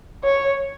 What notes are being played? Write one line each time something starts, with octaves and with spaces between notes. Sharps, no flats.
C#5